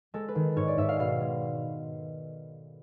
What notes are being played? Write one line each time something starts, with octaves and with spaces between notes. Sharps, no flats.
G#3 A4
B4
D#3
G#2 C#5
D5
G#2 E5
F5
B2 F5
G#3